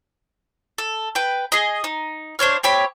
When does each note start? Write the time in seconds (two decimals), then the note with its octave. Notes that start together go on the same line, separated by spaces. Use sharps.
0.78 A4
1.15 B4 G5
1.52 G#4 D#5
1.84 D#4
2.39 D4 C5 C#5 F5
2.63 C4 G4 C#5 B5